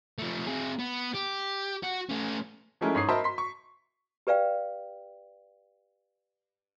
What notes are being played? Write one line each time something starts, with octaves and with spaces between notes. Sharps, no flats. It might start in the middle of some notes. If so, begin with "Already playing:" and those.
F3 A3
C4 G#4
B3
G4
F#4
A3 C#4
F3 G#3 A3 C#4 E4 A#4
G#2 C#5 D#6 C7
A#4 C5 D#5 E5 A5 B5
C6 B6
C#6
G4 B4 D5 F5 G5